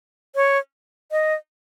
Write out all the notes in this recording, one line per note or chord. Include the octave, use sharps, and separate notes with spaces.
C#5
D#5